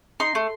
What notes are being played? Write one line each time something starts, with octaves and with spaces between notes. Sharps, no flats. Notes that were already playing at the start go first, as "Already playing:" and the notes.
D#4 C6
A3